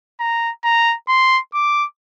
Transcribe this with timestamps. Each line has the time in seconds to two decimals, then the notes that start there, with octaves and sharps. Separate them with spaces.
0.20 A#5
0.64 A#5
1.08 C6
1.54 D6